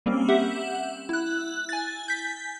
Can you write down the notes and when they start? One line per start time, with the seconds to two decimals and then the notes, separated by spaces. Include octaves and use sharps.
0.06 G3 A#3 C4 C#4
0.28 G4 E5 F#5
1.09 E4 F#6
1.69 G#5 A6
2.08 G6 B6